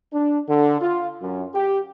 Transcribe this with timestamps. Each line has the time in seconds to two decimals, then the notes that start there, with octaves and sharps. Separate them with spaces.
0.13 D4
0.48 D3
0.81 F4
1.22 F#2
1.55 G4